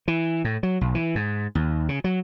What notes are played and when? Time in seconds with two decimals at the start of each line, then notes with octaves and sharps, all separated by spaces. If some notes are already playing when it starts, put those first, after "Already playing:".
0.08 E3
0.45 A2
0.63 F#3
0.81 B1
0.95 E3
1.15 G#2
1.55 D#2
1.89 C#3
2.04 F#3